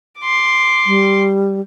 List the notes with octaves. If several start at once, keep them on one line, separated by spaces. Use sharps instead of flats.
C6 D6
G3